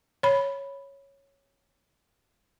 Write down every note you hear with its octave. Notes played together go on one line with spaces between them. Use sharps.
C#5 B5